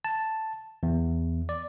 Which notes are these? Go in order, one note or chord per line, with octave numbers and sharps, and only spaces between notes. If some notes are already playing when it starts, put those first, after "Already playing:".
A5
E2
D5